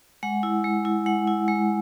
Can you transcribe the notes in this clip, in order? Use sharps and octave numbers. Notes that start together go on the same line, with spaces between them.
G#3 F#5
E4
G#3
E4
G#3 F#5
E4
G#3